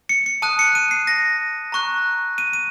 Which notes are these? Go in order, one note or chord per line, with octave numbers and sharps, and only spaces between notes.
C#7
C#7
A5 D#6 F#6 D#7
C#7
D#7
C7
A#6
A#5 C#6 F#6
D#7
D#7